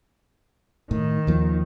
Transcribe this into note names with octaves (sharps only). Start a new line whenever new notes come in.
A2 D#3
D#2 F3 A#3